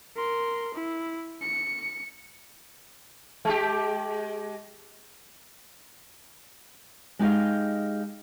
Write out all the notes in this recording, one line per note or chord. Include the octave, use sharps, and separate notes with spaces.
A#4 C6
E4
C#7
G#3 G4
G#3 D#4 G4 D#5 F5